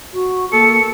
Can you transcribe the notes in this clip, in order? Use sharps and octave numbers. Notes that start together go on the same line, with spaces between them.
F#4
A#3 A4 C#7